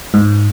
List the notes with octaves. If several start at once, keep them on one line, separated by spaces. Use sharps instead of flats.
G#2